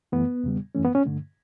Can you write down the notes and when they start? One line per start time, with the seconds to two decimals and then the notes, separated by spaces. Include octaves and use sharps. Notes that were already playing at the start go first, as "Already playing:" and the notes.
0.12 F#2 E3 A3 B3
0.44 E2 C#3 G3
0.75 F#2 E3 A3 C#4
0.84 B3
0.95 C#4
1.05 G2 D3 A3